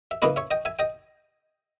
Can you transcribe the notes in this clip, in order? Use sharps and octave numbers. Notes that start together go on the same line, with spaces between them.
E5
C#3 E3 A#3 E4 B4 D#5
C#5 E5
D#5 G5
E5 G#5
D#5 G5